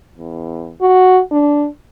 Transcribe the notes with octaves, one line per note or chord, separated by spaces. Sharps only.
E2
F#4
D4